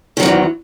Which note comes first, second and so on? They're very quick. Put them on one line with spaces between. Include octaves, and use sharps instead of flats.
D#3 F#3 G#2 E2